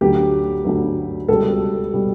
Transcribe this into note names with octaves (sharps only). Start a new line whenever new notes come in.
D2 D3 F#3 G4
D2 D3 F#3
C#2 B2 G3 A4
B2 G3